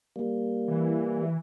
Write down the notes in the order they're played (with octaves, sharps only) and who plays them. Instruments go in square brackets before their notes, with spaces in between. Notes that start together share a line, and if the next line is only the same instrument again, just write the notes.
[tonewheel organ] G3 A#3
[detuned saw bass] E3